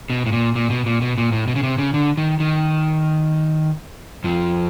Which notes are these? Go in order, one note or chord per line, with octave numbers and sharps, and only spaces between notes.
B2
A2
A#2
A#2
B2
A#2
B2
A#2
A2
B2
C#3
C3
C#3
D3
D#3
D#3
F2 F3